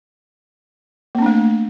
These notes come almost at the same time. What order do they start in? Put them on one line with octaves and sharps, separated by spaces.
A#3 C4 D4 A3